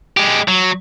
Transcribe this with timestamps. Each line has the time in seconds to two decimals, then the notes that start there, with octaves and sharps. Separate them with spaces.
0.17 G#3 G4
0.48 F#3